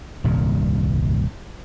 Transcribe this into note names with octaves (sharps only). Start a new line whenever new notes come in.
D#1 C2 G2 A#2